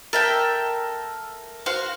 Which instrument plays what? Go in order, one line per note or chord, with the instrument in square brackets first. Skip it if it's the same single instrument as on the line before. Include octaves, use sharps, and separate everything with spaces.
[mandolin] A4 E5 G5 [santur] A#4
[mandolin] F#4 C5 F5